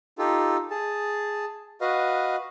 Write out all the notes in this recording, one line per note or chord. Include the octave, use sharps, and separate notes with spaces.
D#4 F4 G4 A4
G#4 A5
F#4 B4 D#5 F5